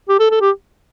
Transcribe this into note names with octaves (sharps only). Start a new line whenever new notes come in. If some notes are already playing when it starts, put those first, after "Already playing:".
G4
A4
A4
G4